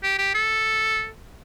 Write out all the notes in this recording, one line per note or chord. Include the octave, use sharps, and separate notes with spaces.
G4
G4
A4